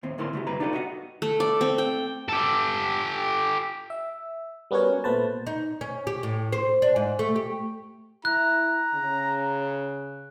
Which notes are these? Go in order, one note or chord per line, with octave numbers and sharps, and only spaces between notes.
D#2 A2 C4
D2 A2 A#3 E4 A5 C6
C#3 A3 F#4 G4
D2 G2 C3 B4 A#5
D4 D#4 F4 G4 A4 B4
F#4 D#5 E5 F#5
A3
D5
C4
G5
G4 A4
E5
G3 B3 C#4 F#4 A#4 C#5
A#2 A3 B3 B4 C5 A5
D#4
C#4
G4
A2
C5
D4
G#2
A3
G4
E4 A#5 F#6
C#3